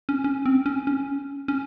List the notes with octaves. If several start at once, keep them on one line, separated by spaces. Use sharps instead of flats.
C#4
C#4
C4
C#4
C#4
C#4